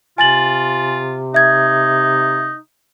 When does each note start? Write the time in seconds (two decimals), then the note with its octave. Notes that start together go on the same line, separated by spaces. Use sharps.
0.18 C3 F4 G#5 A6 F#7
1.34 D#4 E5 G#6